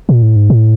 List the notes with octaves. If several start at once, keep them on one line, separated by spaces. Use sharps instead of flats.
A#2
A2
G#2
A2